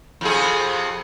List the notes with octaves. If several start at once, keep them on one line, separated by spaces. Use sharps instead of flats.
F2 C3 G#4